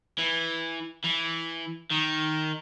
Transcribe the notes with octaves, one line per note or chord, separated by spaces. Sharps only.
E3
E3
D#3